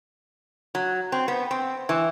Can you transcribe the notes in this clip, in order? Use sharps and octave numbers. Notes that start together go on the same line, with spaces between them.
F#3
C4
B3
C4
E3